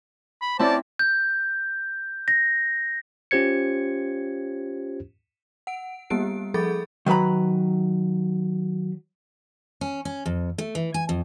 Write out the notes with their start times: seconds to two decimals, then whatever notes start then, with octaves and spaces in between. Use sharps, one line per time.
0.41 B5
0.59 C4 C#4 E4 C5 D5 A5
0.99 G6
2.28 A#6
3.31 C#4 F4 G4 C5 G#6 C#7
5.67 F#5 D7
6.10 G3 A#3 B3 G4 D7
6.54 F3 G#4 A4 B5 A6
7.06 D#3 F#3 B4 A#5 B5
9.81 C#4
10.05 C#4
10.26 F2
10.58 A3
10.75 E3
10.94 G#5
11.09 F2